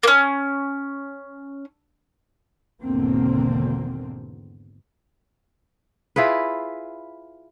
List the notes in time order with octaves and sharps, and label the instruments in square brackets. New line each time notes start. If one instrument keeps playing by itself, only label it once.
[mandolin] A#3 C#4
[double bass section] G#1 E2 B2 D3 A#3 C4
[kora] E4 F4 G#4 B4